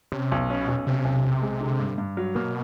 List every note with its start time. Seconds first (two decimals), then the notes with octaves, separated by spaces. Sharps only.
0.12 C3 C#4
0.32 B1
0.49 B2 C#4
0.68 B1
0.87 C3 C#4
1.05 B1
1.24 B1
1.42 G#3
1.60 D3
1.79 G2
1.98 G2
2.17 F#3
2.35 B2 A#3